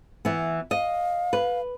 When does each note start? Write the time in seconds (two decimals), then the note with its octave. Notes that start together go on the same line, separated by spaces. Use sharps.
0.25 E3 B3
0.71 D#5 F5
1.33 B4